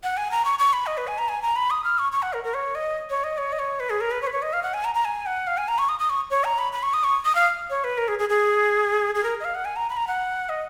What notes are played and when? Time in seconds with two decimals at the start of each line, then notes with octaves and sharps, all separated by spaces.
0.04 F#5
0.17 G#5
0.31 A#5
0.45 C#6
0.59 C#6
0.73 B5
0.86 D#5
0.98 B4
1.07 G#5
1.18 A#5
1.29 G#5
1.42 A#5
1.56 B5
1.71 D#6
1.84 F6
1.99 C#6
2.12 C#6
2.22 F#5
2.33 A#4
2.44 A#4
2.54 C#5
2.75 D#5
3.10 C#5
3.24 D#5
3.38 C#5
3.53 D#5
3.59 C#5
3.80 B4
3.90 G#4
4.01 A#4
4.11 B4
4.22 C#5
4.27 B4
4.32 C#5
4.42 D#5
4.53 F5
4.63 F#5
4.74 G#5
4.84 A#5
4.95 A#5
5.05 G#5
5.26 F#5
5.47 F5
5.58 G#5
5.68 A#5
5.78 C#6
5.89 D#6
5.99 D#6
6.10 C#6
6.31 C#5
6.44 A#5
6.58 B5
6.73 B5
6.83 C#6
6.94 D#6
7.04 C#6
7.25 D#6
7.35 F5
7.70 C#5
7.84 B4
7.98 A#4
8.08 G#4
8.19 G#4
8.29 G#4
9.15 G#4
9.24 A#4
9.40 D#5
9.45 F5
9.55 F#5
9.65 G#5
9.76 A#5
9.90 B5
9.97 A#5
10.07 F#5
10.49 D#5